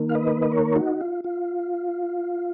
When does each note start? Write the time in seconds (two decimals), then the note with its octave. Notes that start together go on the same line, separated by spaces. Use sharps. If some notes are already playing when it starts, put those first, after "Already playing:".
Already playing: D#3 A#3
0.09 F5
0.15 B4 D#5
0.42 D#5
0.52 A#4 C#5
0.76 D#4 F#4
1.01 F4
1.24 F4